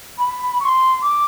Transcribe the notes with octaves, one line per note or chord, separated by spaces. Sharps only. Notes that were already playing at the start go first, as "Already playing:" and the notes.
B5
C#6
C6
D6